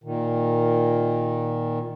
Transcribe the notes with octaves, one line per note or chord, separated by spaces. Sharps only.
A#2 D#3